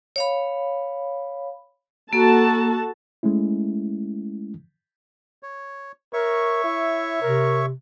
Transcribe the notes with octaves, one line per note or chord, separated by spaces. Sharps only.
C#5 F5 B5
A#3 F#4 A4 A5
G#3 A3 C#4 E4
C#5
A#4 C#5 E5 C#6
E4
C3 A#4